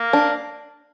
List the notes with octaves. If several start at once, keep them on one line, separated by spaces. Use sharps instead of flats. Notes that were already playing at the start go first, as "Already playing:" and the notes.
Already playing: A#3
D4